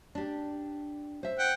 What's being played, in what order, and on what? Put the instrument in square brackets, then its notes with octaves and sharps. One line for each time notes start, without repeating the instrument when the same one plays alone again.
[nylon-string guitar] D4 G4
C5 E5
[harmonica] F#5 G5